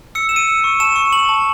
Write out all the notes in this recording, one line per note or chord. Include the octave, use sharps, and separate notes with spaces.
E6 C#7
E6 E7
D#7
E6
C#6
A5 E7
C#6
A5 F#7
A5